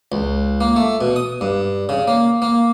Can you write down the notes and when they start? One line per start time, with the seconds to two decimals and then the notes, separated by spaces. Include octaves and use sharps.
0.12 C#2
0.61 A#3
0.76 A3
1.01 B2
1.16 D#6
1.41 G2
1.89 C#3
2.08 A#3
2.42 A#3